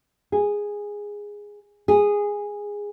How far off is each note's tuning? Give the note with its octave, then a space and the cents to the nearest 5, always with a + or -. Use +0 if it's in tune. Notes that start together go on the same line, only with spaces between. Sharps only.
G#4 -10
G#4 -10